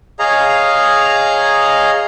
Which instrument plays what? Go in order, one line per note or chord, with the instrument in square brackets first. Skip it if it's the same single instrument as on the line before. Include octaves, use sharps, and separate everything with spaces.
[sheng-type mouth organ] G#4 C#5 D#5 F5 A#5